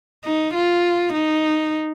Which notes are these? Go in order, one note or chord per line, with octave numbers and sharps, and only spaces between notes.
D#4
F4
D#4